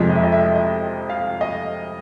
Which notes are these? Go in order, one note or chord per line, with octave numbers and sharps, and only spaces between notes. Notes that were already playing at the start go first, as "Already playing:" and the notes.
Already playing: F2 C3 F3 G#3 C4
D#5
E5
D#5
E5
D#5
F5
D#5